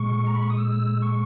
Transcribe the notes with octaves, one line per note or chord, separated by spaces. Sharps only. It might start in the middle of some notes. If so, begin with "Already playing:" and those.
Already playing: A#2 G#3 C#6
A#5
B5
C#6
D#6
E6
C#6